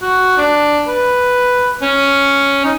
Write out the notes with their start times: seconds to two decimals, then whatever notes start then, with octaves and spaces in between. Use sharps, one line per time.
0.02 F#4
0.38 D4
0.88 B4
1.82 C#4
2.64 D#4